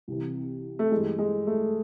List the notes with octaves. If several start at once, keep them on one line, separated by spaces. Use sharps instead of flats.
C2 C3 E3
A3
G2 E3 G#3
G#3
A3